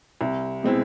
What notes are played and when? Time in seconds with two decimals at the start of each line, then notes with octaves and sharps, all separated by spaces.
0.21 C2
0.63 B2 G#3 C4 E4